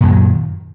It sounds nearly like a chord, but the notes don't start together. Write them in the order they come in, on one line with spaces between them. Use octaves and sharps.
A#2 F#2 F#3 D#3